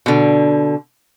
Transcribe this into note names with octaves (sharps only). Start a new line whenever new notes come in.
B2 D3